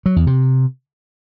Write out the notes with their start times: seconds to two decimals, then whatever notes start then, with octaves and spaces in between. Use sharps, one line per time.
0.06 F#3
0.16 E2
0.27 C3